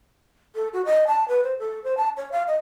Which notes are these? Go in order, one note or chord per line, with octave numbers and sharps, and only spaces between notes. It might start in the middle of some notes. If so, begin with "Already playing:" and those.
A4
F#4
D#5
A5
B4
C5
A4
C5
A5
C#5
F5
D#5